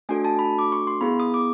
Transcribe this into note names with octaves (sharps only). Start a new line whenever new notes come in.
A3 D4 F#4 A4 G#5
A5
B5
D6
C#6
C6
B3 E4 G#4 B5
D#6
D6